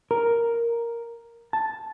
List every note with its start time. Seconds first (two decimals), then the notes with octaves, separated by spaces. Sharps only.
0.11 A#4
1.53 A5